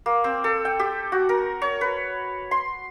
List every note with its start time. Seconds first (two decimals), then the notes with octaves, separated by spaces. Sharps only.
0.06 A#3
0.24 C4
0.44 A4
0.65 G5
0.79 G4
1.12 F#4
1.29 A#4
1.62 C#5
1.81 B4
2.51 C6